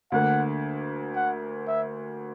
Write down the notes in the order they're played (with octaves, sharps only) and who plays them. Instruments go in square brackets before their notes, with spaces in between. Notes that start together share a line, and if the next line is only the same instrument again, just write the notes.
[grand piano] D2 D3 A#3 [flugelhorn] F#5
[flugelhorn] F#5
E5